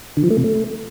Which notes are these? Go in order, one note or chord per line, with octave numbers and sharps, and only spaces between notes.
D3
F3
A3
C3
A3